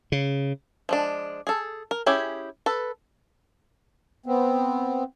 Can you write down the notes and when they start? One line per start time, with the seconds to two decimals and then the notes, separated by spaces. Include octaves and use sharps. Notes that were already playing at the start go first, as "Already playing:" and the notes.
0.12 C#3
0.89 F3 G#3 D4
1.47 G#4 A4
1.91 A#4
2.06 C#4 E4 G4 G#4
2.66 A4 B4
4.26 B3 C4